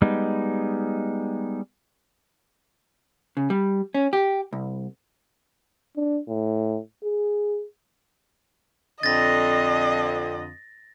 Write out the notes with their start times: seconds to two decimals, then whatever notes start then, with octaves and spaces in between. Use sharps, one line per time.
0.02 G3 G#3 B3 D#4
3.37 C#3
3.50 G3
3.94 C#4
4.13 G4
4.53 C2
5.96 D4
6.29 A2
7.04 G#4
9.03 F2 D3 D#5 A6 A#6